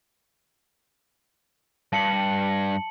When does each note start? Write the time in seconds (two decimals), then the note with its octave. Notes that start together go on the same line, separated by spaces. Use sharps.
1.93 G2 A5 C#7 F#7